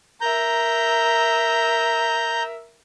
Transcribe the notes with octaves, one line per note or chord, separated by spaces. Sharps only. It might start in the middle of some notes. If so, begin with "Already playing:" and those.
A#4 E5 A#5 G6